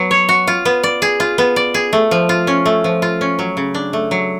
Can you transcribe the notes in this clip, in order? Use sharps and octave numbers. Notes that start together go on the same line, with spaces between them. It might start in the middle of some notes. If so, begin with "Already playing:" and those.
Already playing: F#3 B3
C#5
F#4
F4
B3
D5
G#4
F4
B3
D5
G#4
A3
F3
F4
C#4
A3
F3
F4
C#4
F#3
C#3
D4
A3
F#3